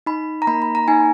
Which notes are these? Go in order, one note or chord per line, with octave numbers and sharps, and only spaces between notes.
D#4 B5
A#5
A#3 B5
B5
A#5
D#4 G#5